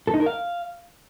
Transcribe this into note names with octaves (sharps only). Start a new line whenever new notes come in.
A4
D#4
A#4
F5